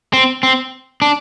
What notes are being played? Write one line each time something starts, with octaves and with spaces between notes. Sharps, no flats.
C4
C4
D4